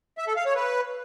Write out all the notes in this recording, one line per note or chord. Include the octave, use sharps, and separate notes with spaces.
E5
A4
F5
C#5
B4